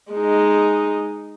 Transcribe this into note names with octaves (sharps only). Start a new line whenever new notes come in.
G#3 D#4